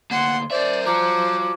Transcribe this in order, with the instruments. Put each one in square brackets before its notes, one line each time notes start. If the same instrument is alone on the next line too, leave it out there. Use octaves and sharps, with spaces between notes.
[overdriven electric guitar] D2 A#3 [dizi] F#5 [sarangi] C6
[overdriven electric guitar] A#4 E5 [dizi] C5 [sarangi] D5
[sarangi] F3 [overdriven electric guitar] F#4 A#5 [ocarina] D6